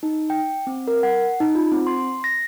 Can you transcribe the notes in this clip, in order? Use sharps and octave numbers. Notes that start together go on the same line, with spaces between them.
D#4
G5
C4
A#4
F#5
D#4
F4
C4
C6
A#6